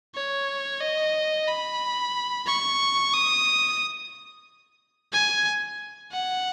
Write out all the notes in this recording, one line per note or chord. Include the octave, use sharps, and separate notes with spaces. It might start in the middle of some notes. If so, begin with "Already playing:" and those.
C#5
D#5
B5
C#6
D#6
G#5
F#5